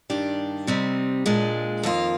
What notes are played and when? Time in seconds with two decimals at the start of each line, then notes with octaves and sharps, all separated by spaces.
0.10 G2 D#3 G3 D4 G4
0.67 C3 G3 C4 D#4
1.26 A#2 G#3 D4
1.83 F2 D#3 A#3 F4